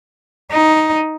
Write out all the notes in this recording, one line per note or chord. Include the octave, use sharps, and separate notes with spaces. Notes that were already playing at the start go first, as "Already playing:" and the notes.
D#4